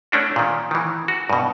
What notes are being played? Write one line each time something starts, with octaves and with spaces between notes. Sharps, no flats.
A3 C#4 D4 F#4
A#2 D#3
D#3 E3
F#4
G2 B2